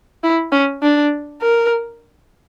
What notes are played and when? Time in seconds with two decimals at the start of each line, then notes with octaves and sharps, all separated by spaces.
0.24 E4
0.52 C#4
0.83 D4
1.42 A#4